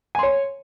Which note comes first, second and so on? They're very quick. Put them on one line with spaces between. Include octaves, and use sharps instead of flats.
G#5 C6 C#5